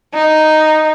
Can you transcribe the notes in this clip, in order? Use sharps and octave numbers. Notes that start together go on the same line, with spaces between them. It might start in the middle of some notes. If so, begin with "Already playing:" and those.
D#4